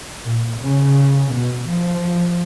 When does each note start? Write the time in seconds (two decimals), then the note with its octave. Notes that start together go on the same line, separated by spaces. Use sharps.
0.25 A#2
0.61 C#3
1.34 B2
1.68 F3